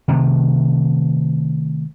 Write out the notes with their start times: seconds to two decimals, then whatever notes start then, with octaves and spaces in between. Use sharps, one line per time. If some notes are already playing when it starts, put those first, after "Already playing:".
0.08 C3 D#3 A3